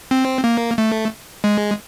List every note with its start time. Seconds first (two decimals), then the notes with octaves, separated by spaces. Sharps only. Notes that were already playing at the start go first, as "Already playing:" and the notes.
0.11 C4
0.44 A#3
0.78 A3
1.44 G#3